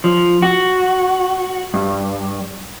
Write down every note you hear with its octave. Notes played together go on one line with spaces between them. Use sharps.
F3
F#4
G2